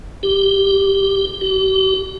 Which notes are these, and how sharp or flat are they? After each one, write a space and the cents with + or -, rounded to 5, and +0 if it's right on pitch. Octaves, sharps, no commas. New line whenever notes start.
G4 +0
G4 -45